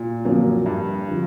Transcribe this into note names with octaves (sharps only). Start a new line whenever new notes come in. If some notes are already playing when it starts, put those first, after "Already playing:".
Already playing: A#2
F#2 D3 F3 A#3
G2
D3 F3